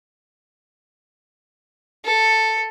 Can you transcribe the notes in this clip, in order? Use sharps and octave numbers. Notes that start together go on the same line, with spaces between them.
A4